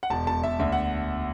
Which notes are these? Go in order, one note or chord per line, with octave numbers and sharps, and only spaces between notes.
F#5
E1 A5
E1 A5
E1 E5
D2 E5
F#5